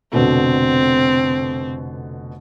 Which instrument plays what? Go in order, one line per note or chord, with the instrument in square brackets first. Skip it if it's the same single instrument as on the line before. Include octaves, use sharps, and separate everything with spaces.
[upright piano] F1 B2 D3 [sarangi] C4